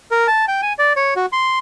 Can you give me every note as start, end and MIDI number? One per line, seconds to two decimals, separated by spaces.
0.11 0.27 70
0.28 0.45 81
0.48 0.61 79
0.62 0.73 80
0.79 0.93 74
0.96 1.14 73
1.16 1.26 66
1.32 1.59 84